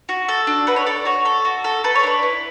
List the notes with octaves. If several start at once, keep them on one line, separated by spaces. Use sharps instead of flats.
F#4
A4
D4
F#4 B4
C#5
A4 D5
F#4 C#5
A4
F#4
A4
A4 B4
C#5
D4 B4
E4